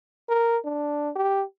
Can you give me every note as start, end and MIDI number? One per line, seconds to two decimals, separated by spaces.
0.29 0.58 70
0.65 1.10 62
1.16 1.43 67